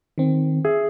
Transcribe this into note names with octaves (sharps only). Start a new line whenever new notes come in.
D#3 C4
G#4 E5